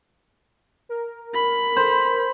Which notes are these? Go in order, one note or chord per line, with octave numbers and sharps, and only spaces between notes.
A#4
B5
C5